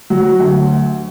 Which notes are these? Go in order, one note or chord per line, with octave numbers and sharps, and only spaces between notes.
F#3
D2